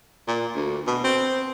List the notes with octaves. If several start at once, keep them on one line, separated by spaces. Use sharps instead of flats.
A#2
D2
B2
C4